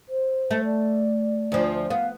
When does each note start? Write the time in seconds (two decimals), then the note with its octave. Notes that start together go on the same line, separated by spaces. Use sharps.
0.09 C5
0.51 A3
0.65 D5
1.52 D2 F3
1.90 B3 F5